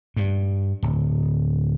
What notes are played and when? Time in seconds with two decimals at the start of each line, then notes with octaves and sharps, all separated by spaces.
0.16 G2
0.83 D1